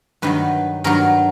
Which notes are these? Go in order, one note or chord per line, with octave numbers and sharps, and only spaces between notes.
G2 D#3 F#3 B4
G2 D#3 F#3 A#4